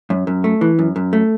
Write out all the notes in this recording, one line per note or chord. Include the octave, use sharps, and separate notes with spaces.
F#2
F#2
A3
E3
F#2
F#2
A3